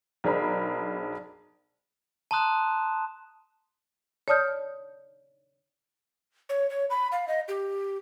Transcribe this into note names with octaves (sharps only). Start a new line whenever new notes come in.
B1 D4 G#4 A#4 C5 B5
A5 A#5 C6 D#6 F#6 E7
C#5 D5 A5 D#6 F6 G6
C#5
C#5
B5
F5
D#5
G4